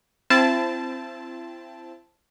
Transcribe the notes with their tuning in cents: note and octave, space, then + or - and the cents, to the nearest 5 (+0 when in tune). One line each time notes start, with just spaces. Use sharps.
C4 +0 E4 +40 A5 -10